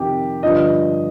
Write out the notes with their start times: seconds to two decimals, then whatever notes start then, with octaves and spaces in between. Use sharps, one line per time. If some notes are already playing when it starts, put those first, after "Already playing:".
Already playing: F2 C3 D#3 G4
0.43 G2 D3 F3 D#5